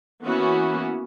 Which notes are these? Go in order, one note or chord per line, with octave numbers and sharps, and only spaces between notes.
E3 A#3 B3 C#4 F#4